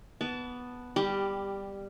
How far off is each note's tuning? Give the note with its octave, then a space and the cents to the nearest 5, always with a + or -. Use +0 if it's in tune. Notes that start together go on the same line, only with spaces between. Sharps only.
B3 +0 A5 -5 D6 -45
G3 +15 G4 +0